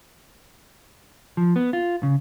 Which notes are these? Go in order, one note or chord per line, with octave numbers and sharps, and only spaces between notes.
F3
B3
F4
C#3